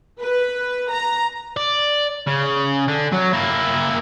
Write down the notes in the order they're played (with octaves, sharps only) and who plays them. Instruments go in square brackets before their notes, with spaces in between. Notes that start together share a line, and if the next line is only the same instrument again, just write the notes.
[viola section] B4
A#5
[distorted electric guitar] D5
C#3
D3
F#3
A#3 E4